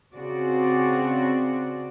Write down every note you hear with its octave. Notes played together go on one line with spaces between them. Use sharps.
C#3 C4 F#4 D5